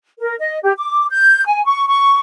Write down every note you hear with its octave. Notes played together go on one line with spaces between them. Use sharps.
A#4
D#5
G4
D6
G6
G#5
C#6
C#6